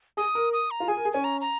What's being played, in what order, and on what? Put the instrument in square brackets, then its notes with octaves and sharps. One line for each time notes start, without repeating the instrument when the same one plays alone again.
[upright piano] G#4 [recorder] D#6
[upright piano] A#4
[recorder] D#6
A#5
[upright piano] F4
[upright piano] G#4 [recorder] G#5
[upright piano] A#4
G#4
[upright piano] C#4 [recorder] G#5
[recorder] A#5
A#5